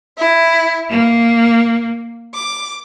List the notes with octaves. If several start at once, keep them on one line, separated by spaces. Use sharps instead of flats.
E4
A#3
D6